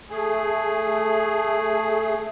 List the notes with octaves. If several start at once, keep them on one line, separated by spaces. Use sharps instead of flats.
A3 G#4